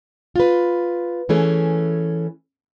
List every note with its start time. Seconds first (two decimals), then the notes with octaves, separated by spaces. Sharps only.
0.36 F4 B4
1.29 E3 A3 C#4 G#4